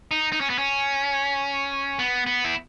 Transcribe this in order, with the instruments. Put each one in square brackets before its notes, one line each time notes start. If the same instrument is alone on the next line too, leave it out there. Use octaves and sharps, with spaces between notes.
[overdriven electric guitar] D#4
D#4
C#4
B3
C#4
B3
B3
E4